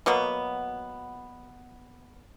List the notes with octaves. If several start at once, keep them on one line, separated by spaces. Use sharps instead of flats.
B2 F#3 A#3 B3